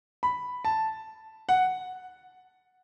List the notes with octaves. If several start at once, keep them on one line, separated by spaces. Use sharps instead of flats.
B5
A5
F#5